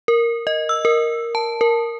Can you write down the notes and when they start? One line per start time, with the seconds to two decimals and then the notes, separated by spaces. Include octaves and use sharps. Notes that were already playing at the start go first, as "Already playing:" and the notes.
0.08 A#4
0.47 D#5
0.69 E6
0.85 A#4
1.35 A5
1.61 A#4